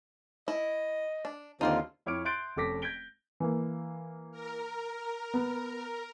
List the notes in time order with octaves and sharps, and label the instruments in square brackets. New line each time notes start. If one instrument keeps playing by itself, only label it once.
[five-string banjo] E4 [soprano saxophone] D#5
[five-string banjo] D4
[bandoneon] D#2 D3 F4 [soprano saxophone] C4 [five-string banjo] D#4 C5 D5
[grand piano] F2 E4 C#5 D6 F6 D7
E5 C6 F#6 G6 A6 D7
F1 C#4 A4 D6 A#6 B6
G6 G#6 A#6 B6 D7 G7
[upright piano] E3 A#3
[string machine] A#4
[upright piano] B3